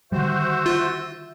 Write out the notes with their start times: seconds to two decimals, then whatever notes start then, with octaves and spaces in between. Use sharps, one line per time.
0.12 D3 D#3 G3 F#4 C5 E5
0.66 F4